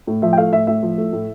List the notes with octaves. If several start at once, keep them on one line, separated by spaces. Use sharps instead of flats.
A2
F3 E5
G5
A3 F5
A2 E5
A2 E5
F3
A3
A2